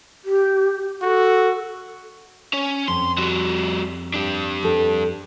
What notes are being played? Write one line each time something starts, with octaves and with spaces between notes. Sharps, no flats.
G4
F#4 A4
C#4 C#5
F2 C6
G3 F#4
D4 G4
F2 A4